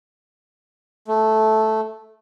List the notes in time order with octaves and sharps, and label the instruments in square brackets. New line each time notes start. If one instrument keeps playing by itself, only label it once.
[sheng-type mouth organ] A3